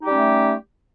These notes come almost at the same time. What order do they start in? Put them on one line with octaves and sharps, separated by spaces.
D#4 G4 G3 C#4 A3